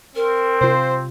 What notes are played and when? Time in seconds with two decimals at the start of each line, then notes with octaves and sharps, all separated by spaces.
0.16 C4 A#4
0.61 C3 F4 C5